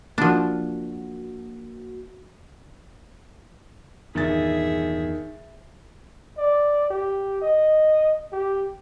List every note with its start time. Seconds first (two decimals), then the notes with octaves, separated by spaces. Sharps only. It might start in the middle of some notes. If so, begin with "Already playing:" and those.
0.18 F3 A#3 D4 F#4
4.15 E2 G2 A#2 D#3 G#4 E5 A6
6.37 D5
6.90 G4
7.42 D#5
8.32 G4